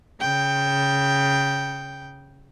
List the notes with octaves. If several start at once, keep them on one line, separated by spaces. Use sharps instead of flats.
C#3 G5